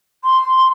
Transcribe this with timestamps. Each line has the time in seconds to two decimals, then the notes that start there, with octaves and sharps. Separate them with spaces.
0.24 C6